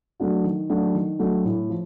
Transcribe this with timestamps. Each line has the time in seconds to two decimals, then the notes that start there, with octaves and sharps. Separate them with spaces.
0.20 F#3 A3 D4 F#4
0.44 D#3
0.70 F#3 A3 D4 F#4
0.94 D#3
1.19 F#3 A3 D4 F#4
1.45 A2
1.70 F3